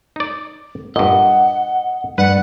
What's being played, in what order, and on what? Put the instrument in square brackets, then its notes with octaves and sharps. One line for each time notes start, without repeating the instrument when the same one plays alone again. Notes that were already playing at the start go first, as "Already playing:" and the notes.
[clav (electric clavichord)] D#4 D5
[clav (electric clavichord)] G2 A#2 [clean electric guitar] D#5 [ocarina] F#5
[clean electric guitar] G2 [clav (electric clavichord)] B4 [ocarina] D5 [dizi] F#5